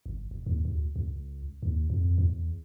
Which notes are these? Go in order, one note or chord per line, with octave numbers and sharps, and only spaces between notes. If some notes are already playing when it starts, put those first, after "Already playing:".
G1
E1
D#2
D2
C#2
D#2
F2
E2